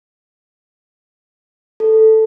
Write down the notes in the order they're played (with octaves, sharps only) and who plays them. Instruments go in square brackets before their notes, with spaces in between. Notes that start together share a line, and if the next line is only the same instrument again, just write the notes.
[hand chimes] A4